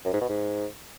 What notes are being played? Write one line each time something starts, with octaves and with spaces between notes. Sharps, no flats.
F#2
G#2
B2
G#2